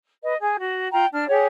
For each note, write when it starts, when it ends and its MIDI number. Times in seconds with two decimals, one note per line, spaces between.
0.23 0.34 71
0.23 0.34 75
0.40 0.56 68
0.59 0.86 66
0.92 1.05 65
0.92 1.05 79
0.92 1.05 82
1.12 1.27 62
1.12 1.27 89
1.29 1.47 67
1.29 1.47 68
1.29 1.47 73
1.29 1.47 78